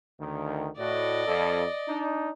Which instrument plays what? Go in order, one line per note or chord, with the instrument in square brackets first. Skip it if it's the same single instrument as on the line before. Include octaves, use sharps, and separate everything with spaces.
[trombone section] D2 D#3
[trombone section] A2 F#4 [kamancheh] D5 D#5
[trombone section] F2 A4
D4 D#4